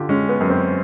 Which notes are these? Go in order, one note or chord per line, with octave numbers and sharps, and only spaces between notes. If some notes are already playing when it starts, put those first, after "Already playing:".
Already playing: D3 F4 G4
G#3 C#4
B3
F#2
C4